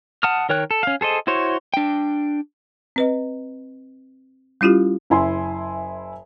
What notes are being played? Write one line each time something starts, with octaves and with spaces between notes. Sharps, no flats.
F#5 A5 D#6 F6
D#3 A#4 C#5 G5 F#6
A4
C#4 F5
G#4 A4 C5 D#5
E4 F#4 C5 C#5
D4 G5
C4 B4 D#5
G3 C#4 E4 F4 G4
F#1 E4 G#5 C6